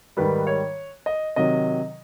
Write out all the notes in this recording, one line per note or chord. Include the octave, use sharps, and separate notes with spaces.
G#2 D#3 G3 B4
C#5
D#5
C3 D#3 F#3 D#5